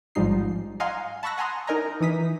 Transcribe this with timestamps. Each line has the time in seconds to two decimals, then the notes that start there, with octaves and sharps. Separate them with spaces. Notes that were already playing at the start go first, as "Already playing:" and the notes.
0.15 A1 G#2 F3 G3 D#4 C7
0.80 D#5 F5 F#5 G#5 A#5 C6
1.23 A5 B5 C#6 E6 F#6 A#6
1.38 F#5 G#5 A#5 C6 D#6
1.67 D#4 A#4 D#5 G#5 A#5
2.00 E3 D#4 D#6 B6